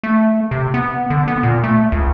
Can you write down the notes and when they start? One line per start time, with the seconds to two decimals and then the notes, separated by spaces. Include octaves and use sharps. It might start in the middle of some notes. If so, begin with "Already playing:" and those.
0.03 A3
0.51 C3
0.74 B3
1.10 D3
1.28 B3
1.43 A#2
1.64 A3
1.92 C#2